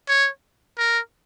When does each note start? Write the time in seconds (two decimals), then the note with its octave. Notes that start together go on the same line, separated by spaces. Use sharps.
0.08 C#5
0.78 A#4